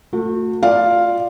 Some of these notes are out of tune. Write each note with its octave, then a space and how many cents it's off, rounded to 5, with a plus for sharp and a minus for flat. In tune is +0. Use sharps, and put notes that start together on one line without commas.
A3 +30 F#4 -30
F4 +0 D5 +0 F5 +0